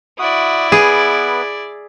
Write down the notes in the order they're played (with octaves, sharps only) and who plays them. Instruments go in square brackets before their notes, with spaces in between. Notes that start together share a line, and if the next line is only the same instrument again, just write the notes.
[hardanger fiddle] E4 D5 [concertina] F#4 D#6
[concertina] B3 B4 [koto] G#4